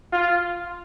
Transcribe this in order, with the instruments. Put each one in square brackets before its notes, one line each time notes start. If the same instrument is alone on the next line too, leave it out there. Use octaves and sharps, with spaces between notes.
[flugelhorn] F4